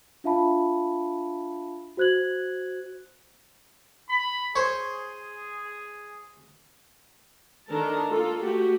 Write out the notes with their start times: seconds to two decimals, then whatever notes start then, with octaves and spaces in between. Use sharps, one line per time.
0.24 D4 F4 E5 F5 A5 B5
1.97 F#4 C5 F#6 G#6 F#7
4.09 B5
4.56 G#4 C5 C#5
7.68 D#3 D4 A4 A#4 A5
8.09 A#3 F4 A4
8.43 A3 F#4 G4